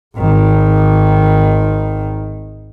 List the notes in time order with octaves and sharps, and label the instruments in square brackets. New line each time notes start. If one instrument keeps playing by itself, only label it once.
[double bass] G#1 D#3